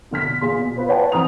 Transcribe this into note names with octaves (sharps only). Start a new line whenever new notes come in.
B2 D3 F6 B6
E2 A#2 G#4 C6
B2
F4 B4 C5
B4 C#5 D5 F#5 G5 A5
E3 C4 A#5 D#6 F7